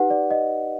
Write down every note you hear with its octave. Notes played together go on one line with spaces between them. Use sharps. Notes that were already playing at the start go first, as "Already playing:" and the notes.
Already playing: D#4 G4 B4 F#5
D5
D#5